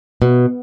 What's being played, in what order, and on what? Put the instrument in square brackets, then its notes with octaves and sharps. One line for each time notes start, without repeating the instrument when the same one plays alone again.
[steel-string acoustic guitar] B2